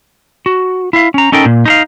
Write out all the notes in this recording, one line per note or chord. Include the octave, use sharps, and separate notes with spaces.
F#4
E4 E5 F5
C#4 A#5
C#4 D#4 A4 A#4 G5
A#2
D#4 A4 F5